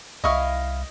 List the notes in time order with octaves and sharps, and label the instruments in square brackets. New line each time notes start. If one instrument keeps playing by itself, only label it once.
[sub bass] C2 [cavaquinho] E4 F5 [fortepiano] D#5 C#6 D#6